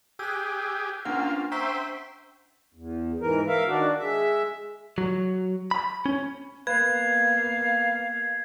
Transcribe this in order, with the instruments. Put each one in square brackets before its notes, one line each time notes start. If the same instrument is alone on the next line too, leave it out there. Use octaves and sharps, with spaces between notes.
[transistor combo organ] G4 G#4 [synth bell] E6 F#6
[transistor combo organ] A#3 F4 [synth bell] C#4 D4 F#5
[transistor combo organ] C5 E5 G5 [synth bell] A#5 C#6 B6
[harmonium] E2
G#2 E3 A#4
A#4 E5 F5
D#3 D4 F#4
G#3 E5
[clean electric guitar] F#3
B5
C#4
[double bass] A#3 B3 [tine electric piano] B4 [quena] F5 [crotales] G#6